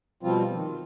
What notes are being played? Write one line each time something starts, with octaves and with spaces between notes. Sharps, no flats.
B2 F3 G3 C4 F4
D#3